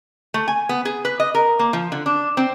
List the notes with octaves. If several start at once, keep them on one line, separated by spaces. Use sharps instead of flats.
A3
G#5
B3
G#4
B4
D#5
A#4
A#3
F3
D3
D4
C4